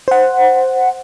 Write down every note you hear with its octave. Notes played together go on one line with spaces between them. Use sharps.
C5 F#5